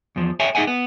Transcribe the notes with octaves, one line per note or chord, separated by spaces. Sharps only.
E2 F3
A4 C#5 E5 G5 G#5
D#4 G#4 E5 F#5 G#5
B3